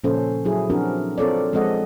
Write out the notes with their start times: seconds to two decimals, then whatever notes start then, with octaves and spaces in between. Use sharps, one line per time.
0.04 A#2 C#3 F3 C#4 A4 C5
0.45 F#3 E4 G#4
0.70 F3 C4 D4 F#4 A#4
1.18 C4 F4 A4 A#4 C#5 D5
1.52 F3 G#3 C4 A4 D#5 F#5